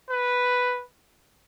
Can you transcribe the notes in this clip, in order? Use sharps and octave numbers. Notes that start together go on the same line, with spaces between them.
B4